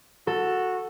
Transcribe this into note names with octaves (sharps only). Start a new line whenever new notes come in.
F#4 A4